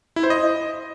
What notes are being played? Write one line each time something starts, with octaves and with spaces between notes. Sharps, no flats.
E4
C5
D#5